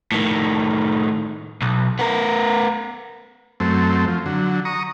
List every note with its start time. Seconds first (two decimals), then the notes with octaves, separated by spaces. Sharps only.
0.12 A2 D#3
1.62 B1
1.99 B3 A#4
3.60 F#2 A3 C4
4.08 F3
4.26 D3 F#3
4.65 A#5 C#6 D#6